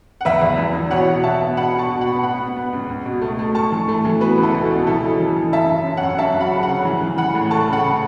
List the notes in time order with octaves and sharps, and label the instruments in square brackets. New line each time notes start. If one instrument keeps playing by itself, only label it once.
[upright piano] F#5
E2 B4 E5
E2
E3
E3
B2 C#5 F#5
B2
B2 E5 A5
B3
B2 F#5 B5
B2
A5 C#6
B2
F#5 B5
B3
B3 F#5 B5
B3
B3
C#2
C#2
B2
A3
A3
A2 A5 C#6
E3
A3
E3
B3 F#4 B4
C#2
E4 A4
B2
F#4
B2
E3 E4 A4
C#3
E3
E3
F#2 E5 A5
F#2
F#2
C#5 F#5
F#2
F#2 E5 A5
F#3
F#5 B5
C#3
F#5 B5
C#3
E3
E3
E3 F#5 B5
A2
A3 A5 C#6
C#3
F#5 B5
C#3